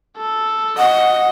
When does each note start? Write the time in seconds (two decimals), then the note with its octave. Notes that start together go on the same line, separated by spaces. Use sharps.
0.17 A4
0.78 D#5 F#5